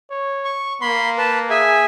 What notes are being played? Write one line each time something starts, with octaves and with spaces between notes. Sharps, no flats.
C#5
C#6
A#3 B5 C6
B4 A5
G#4 E5 G#5